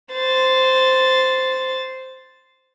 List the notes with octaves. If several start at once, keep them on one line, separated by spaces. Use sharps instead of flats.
C5 A6